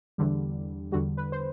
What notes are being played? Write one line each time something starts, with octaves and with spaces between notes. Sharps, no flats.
E2 D3 G3
E2 D3 G3 F#4
B4
C5